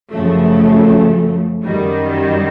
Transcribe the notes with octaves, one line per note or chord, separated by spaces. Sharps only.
F#2 C#3 F3 A3
F#2 D#3 G3